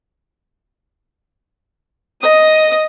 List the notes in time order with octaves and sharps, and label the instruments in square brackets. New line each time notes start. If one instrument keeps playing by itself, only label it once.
[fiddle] D#5 D#6